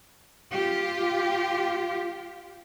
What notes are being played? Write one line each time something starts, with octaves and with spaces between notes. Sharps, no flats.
F4 G4